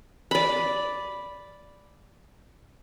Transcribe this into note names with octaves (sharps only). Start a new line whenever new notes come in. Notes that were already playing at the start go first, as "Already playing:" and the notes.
D5 B5